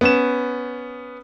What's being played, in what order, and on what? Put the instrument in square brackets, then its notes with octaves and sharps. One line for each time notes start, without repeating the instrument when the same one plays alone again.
[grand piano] B3 C#4 E7